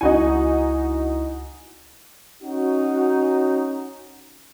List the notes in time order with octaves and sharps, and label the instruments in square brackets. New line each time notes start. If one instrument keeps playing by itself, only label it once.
[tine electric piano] C#2 E4 [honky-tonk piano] D#4 F#4 G#5
[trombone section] C#4 D#4 F#4